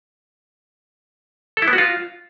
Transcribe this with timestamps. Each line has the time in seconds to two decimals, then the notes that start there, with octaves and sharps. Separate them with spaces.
1.57 A4
1.62 E4
1.68 B3
1.73 F#4
1.78 F4